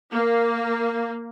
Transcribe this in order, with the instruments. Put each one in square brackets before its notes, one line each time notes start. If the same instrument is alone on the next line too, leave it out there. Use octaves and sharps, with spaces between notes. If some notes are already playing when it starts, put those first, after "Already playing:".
[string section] A#3